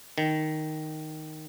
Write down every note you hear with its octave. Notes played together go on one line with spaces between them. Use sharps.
D#3